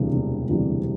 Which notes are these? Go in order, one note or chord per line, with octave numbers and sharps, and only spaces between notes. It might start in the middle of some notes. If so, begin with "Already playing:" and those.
Already playing: E1 D2 C3 E3 G3
E1
D2 C3 E3 G3